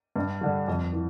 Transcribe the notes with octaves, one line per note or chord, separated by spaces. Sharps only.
G2
D3 G3
F2
E3